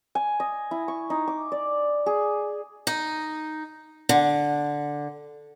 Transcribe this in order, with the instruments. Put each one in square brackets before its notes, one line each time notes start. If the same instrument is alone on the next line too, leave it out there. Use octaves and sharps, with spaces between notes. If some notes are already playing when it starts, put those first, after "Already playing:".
[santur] G#5
D#5
E4
C#6
D#4
D6
D5
G#4
[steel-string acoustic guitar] D#4
D3